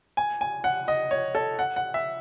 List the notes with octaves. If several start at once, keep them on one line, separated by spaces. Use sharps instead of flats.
G#5
G#5
F#5
D#5
C#5
A4
F#5
F#5
E5